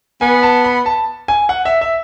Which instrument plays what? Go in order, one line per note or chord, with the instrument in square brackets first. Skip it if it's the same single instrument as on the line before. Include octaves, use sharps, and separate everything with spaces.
[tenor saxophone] B3 [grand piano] G#5
[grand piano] A5
B5
A5
G#5
F#5
E5
E5